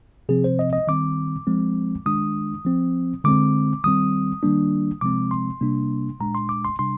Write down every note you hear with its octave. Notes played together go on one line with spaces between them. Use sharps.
C3 F3 C4 G#4
C5
D#5
D#5
D#3 G3 C4 D6
F3 G#3 C4
D#3 G#3 D4 D#6
F3 C4
D3 G#3 C4 D6
D#3 G3 C4 D#6
D#3 G3 A#3 D4
C3 F3 G#3 C4 D6
C6
C3 G3 A#3 D4
A#2 G#3 D4 A#5
C6
D6
C6
C3 G3 D4 C6